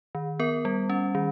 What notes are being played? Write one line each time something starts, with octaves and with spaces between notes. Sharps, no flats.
D#3
B3 A#4
G3
C#4
D#3